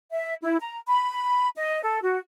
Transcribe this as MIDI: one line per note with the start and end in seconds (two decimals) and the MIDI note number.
0.13 0.34 76
0.43 0.57 64
0.60 0.77 82
0.88 1.47 83
1.57 1.80 75
1.83 2.00 69
2.02 2.18 66